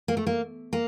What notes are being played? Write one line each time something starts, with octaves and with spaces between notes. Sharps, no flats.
A#3
A3
A#3
A#3